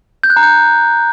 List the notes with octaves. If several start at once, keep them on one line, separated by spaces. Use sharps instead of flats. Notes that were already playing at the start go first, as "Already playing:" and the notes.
G6
F#6
A#5
G6